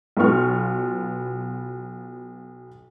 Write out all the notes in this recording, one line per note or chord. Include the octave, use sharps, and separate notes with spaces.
B1 B2 B3 F4 C#6 F6